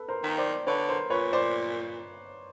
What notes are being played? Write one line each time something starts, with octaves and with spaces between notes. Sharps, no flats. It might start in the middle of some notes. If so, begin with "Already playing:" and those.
Already playing: A4 B4
A#4 C5
D#3
C5 D5
D3 B4 C#5
A#4 C5
A#2 B4 C#5
C5 D5